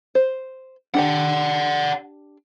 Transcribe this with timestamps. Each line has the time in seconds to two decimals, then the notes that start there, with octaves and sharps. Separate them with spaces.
0.15 C5
0.94 D4 G4 D5 F#5 A5